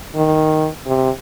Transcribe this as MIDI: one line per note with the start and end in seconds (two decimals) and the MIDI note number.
0.16 0.68 51
0.87 1.10 48